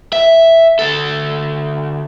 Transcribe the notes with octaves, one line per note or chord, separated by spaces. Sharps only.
E5
D2 A4